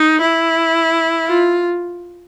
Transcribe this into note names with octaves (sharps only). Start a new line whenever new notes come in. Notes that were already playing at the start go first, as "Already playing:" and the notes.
Already playing: D#4
E4
F4